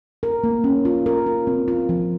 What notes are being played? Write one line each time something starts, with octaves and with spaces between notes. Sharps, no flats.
A#4
A#3
C#4
F4
A#4
F4
C4
F4
F3